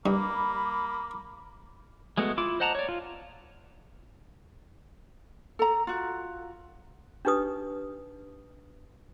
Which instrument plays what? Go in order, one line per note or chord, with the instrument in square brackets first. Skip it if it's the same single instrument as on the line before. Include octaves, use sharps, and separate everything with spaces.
[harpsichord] G2 [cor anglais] A#3 [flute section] B5 D6
[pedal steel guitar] G#3 A3 B3 F#4
E4 F4 D6
C5 D#5 F#5 A5 A#5
C#5 D5
F4
[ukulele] A4 A#5
F4 F#4
[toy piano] D4 D#4 G4 B4 D#6